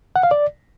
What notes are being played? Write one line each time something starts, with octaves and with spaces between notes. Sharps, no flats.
F#5
F5
D5